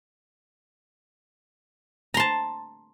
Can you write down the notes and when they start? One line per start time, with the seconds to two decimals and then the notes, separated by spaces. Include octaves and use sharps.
2.14 A#5
2.17 C6
2.20 A5